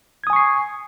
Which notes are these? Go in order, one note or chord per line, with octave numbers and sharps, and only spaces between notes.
G#5 C#6 D#6 G#6 C7